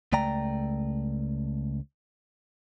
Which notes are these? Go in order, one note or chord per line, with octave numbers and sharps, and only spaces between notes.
C#2 A3 D5 G5 A#5